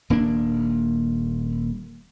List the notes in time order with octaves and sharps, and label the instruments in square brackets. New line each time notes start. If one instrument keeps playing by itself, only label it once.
[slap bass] D#1 A#3 D4